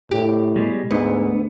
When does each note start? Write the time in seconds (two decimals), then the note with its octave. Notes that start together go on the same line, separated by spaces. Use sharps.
0.11 A2 G4
0.56 B2 G3 G#3
0.91 D2 G#2 B3